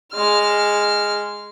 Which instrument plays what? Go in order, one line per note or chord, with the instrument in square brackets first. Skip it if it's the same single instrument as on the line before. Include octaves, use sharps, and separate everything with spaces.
[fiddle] G#3 F6